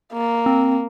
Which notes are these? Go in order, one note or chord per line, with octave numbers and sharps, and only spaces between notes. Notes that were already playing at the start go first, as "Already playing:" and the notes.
A#3
C4